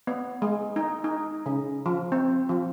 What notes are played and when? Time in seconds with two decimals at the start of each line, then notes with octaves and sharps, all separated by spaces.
0.07 B3
0.42 G#3
0.76 D#4
1.04 D#4
1.46 C#3
1.86 F3
2.12 C4
2.49 F3